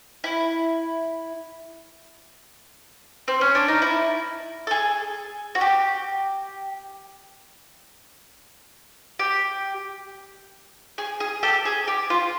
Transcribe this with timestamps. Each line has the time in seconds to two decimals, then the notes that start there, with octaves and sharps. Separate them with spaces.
0.24 E4
3.28 C4
3.41 C#4
3.55 D4
3.68 D#4
3.82 E4
4.67 A4
4.71 G#4
5.55 F#4
5.61 G4
9.19 G4
10.98 G#4
11.20 G#4
11.43 G4 A4
11.65 G#4
11.88 G4
12.10 F4